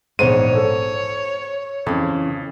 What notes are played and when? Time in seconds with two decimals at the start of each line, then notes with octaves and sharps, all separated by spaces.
0.19 A#1 E2 G#2 C5 C#5 D#7
0.54 A4
1.86 F2 C#3 E3